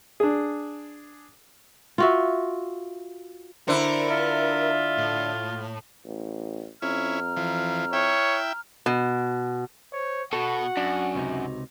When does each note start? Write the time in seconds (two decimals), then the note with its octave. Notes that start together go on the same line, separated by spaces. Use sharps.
0.20 D4 G#4
1.98 F4 F#4 E5
3.68 D3 E4 A#4 C5
4.10 F4 E5
4.98 A2
6.05 A1
6.82 F2 C#4 E4 A#5 F6
7.37 E3 F3
7.93 E4 C#5 E5 G5
8.86 B2
9.92 C5 C#5
10.33 B2 F#4 A4 F#5
10.77 F#2 D4
11.15 C#2 C3 D#4